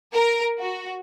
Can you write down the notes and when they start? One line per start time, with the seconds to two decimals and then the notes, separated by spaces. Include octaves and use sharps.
0.14 A#4
0.60 F#4